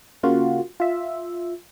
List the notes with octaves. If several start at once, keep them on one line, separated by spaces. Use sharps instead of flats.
C#3 A#3 F4 F#4
F4 E5